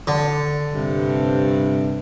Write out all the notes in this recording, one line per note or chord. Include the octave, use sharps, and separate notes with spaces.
D3
G2 C3